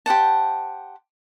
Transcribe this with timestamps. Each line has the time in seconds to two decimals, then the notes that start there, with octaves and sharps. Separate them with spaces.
0.06 G4 C5 F#5 A5